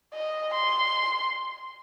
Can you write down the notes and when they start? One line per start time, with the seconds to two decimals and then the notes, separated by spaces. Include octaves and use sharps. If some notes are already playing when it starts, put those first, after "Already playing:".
0.14 D#5
0.54 C6